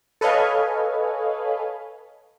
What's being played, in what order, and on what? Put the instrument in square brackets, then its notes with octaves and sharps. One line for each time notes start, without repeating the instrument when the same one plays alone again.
[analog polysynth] A4 B4 C#5 D#5 F5 G#5